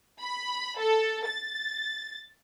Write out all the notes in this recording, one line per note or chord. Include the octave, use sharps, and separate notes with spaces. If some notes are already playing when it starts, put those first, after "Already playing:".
B5
A4
A6